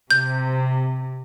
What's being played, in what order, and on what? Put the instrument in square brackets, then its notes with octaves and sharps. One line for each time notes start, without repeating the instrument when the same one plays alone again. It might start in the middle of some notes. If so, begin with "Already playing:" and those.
[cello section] C3 [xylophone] G6